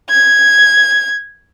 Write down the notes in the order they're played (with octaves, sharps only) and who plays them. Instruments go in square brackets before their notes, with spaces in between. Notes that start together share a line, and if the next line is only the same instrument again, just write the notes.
[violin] G#6